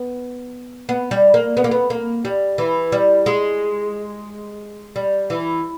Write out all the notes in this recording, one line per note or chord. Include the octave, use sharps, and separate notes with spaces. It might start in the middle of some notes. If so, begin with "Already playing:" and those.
Already playing: B3
B3
G3
A#3
B3
A#3
B3
A#3
G3
E3
G3
G#3
G3
E3